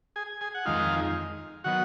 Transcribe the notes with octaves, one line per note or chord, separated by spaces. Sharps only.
G#4 G#5
G#4 G#5
F#5
F2 D#3 G#3 D#4 F4 F5
D#3 F#3 B3 F#4 F#5